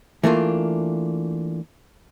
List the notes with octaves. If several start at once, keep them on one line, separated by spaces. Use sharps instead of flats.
E3 A3 A#3 D4 F4